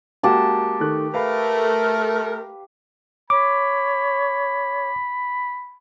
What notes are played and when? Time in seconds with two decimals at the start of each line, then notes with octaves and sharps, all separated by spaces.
0.23 G#3 A#3 F#4 G4 A5
0.80 D#3 A3 F#6
1.14 A3 A#4 B4 F5 B5
3.30 C#5 B5 D6